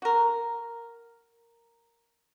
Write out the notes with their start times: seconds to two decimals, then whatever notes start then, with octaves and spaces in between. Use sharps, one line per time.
0.02 F#4 A#4